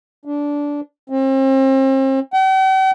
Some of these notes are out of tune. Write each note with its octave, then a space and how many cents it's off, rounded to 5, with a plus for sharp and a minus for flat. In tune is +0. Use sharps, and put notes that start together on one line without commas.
D4 -15
C4 +40
G5 -45